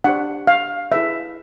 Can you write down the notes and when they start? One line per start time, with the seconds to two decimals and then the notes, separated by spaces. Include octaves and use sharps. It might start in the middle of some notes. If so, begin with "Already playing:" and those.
0.04 D4 G4 C5 F#5
0.47 F5
0.91 E4 G#4 B4 E5